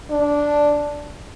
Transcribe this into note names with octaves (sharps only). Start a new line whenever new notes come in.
D4